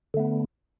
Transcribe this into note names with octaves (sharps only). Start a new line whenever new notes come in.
D3 A3 B3